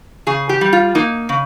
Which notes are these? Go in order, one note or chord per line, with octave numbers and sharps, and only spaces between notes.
C#3 G#4
G4
G3
F4
A#3 D#4
C#3